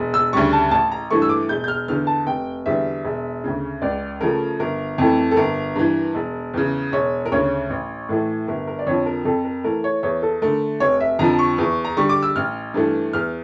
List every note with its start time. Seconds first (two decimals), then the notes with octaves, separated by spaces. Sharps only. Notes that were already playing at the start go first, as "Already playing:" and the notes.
Already playing: E1
0.14 E6
0.33 D2 C#3 G3 C#6
0.53 A5
0.71 A1 A5
0.91 A#5
1.11 G2 E3 A3 C#6
1.22 E6
1.29 D6
1.49 E1 G6
1.64 G6
1.68 F6
1.88 E2 D3 F6
2.07 A5
2.26 F1 G5
2.66 E2 D3 G3 E5
3.05 E1
3.44 D2 C#3
3.82 C#2 D5
4.21 C#3 F3 A3 A#4
4.60 G1 A#4
4.98 F2 E3 A3
5.31 A4
5.37 G1 A#4
5.76 G2 E3
6.15 E1
6.54 E2 C#3
6.92 E1 C#5
7.26 A#4
7.32 D2 C#3 C#5
7.70 A1
8.09 A2 E3 A3
8.48 G1 A#4
8.67 A#4
8.79 D5
8.87 F2 D3 F3 C#5
9.06 A#4
9.25 F2 A4
9.44 A#4
9.64 E3 A3 A#4
9.84 C#5
10.03 E2 C#5
10.22 A4
10.42 D3 A3 A#4
10.80 F1 C#5
11.01 E5
11.19 F2 D3 F3 A#5
11.39 C#6
11.58 E2
11.85 A#5
11.97 D3 G3 C#6
12.09 D6
12.23 E6
12.36 A1 F6
12.74 G2 E3 A3
13.13 E2 F6